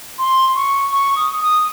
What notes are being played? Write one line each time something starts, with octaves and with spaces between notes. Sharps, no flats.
C6
C#6
C#6
D#6
D#6